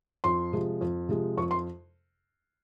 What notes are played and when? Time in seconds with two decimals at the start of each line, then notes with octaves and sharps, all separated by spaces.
0.24 F2 C6
0.53 C3 F3 G#3
0.81 F2
1.09 C3 F3 G#3
1.37 F2 C#6
1.51 C6